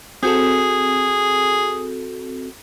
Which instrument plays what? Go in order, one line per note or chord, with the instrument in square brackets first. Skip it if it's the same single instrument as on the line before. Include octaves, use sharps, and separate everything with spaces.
[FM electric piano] C4 F#4 A4 [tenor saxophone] G#4